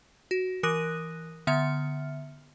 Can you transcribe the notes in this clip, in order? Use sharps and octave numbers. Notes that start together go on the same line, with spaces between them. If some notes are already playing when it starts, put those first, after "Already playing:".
F#4
E3 A#4 D#6 F#6 A#6 D#7
D3 B3 E5 F6 C#7